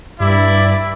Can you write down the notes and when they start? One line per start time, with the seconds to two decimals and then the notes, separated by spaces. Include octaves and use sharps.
0.20 G2 E4 D5